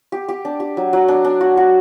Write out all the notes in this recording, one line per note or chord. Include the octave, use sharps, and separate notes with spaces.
G4
G4
D4
G4
F#3
F#3
D4
D4
F#4
F#4